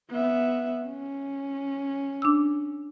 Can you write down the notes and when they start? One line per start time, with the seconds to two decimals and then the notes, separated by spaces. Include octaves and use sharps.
0.11 B3 E5
0.85 C#4
2.22 D4 D6 E6